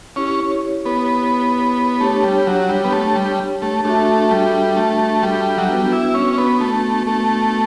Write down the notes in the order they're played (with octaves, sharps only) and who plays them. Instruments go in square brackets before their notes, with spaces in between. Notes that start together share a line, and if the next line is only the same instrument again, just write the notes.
[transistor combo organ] C#4 [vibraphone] E4 G4 C#5
[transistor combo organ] B3
[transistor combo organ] A3 [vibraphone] D4 G4 C#5
[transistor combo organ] G3
F#3
G3
B3
A3
G3
A3
[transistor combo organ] A3 [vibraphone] D4 F#4 A4 E5
[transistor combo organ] G3
A3
G3
F#3
[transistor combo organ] G3 [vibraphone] B3 D4 F#4 B4
[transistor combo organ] E4
C#4
B3
A3
A3